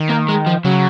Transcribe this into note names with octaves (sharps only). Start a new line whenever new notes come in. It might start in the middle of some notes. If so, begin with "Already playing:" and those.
Already playing: D#3
A#3
G#3
F3
C#3 F#3